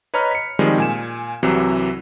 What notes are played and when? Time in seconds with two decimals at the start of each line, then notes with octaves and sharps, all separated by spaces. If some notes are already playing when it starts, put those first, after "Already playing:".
0.14 B4 C#5 D#5 A#5 B5 F6
0.31 B6 C#7
0.59 D#3 F3 G3 G#3 C4
0.78 A#2 G#5 E7
1.43 C2 C3 E3 F#3